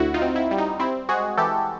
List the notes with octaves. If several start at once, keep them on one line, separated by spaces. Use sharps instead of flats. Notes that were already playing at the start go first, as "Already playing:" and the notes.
Already playing: D2 E4 F#4
D#4 F4
C4
E4
G3
D#4
C4 E4
G#3 F#4 G#4
E3 G4 A4